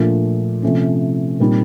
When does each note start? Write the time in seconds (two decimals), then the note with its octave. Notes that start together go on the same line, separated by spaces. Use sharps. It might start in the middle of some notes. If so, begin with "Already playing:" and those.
Already playing: A#2 F3 A3 D4 F4
0.62 C3 F3 A3 C#4
1.40 A#2 G3 C4 D#4